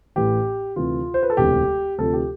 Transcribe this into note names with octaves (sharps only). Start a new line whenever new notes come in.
A1 A2 E3 G4
D2 C3 E3 F4
C5
B4
A4
E1 D2 C3 E3 G4
D2 C3 F3 A4
G4